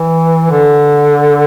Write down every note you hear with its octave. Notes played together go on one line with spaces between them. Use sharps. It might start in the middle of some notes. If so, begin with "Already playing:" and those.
Already playing: E3
D3